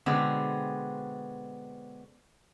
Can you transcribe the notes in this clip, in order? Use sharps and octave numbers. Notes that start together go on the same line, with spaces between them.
B2 D3 G#3 B3 C4